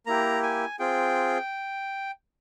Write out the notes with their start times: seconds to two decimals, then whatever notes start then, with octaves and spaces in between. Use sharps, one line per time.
0.06 A#3 E4 G4 A#5
0.43 G#5
0.79 C4 F4 G#4 G5